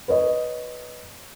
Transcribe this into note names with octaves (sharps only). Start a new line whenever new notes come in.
B4 C#5 D#5